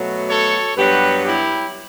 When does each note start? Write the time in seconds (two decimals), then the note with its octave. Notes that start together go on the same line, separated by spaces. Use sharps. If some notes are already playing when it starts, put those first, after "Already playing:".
Already playing: B2 F#3 A3
0.29 A4 C#5
0.77 G2 F#3 B3 G4 B4
1.25 E4 G4